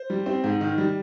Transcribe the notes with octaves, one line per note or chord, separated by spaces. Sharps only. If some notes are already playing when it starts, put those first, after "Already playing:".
Already playing: C5
G3
C4
G#2
D#3
G3